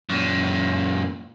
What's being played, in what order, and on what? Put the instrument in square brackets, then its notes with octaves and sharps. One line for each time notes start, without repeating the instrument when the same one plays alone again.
[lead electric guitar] F#2 A#2